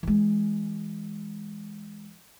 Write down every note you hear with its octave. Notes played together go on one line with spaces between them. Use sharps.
E3 G#3